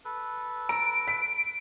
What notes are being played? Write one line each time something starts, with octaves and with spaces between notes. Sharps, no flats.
A4 B4
A#5 E6 D7
B6